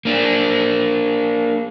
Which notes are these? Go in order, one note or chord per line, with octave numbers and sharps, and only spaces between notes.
A#3 D4